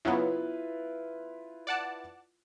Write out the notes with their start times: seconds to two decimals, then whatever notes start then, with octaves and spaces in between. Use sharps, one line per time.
0.05 C#3 F#3 B3 E4 F4 B4
1.67 D5 F#5 A5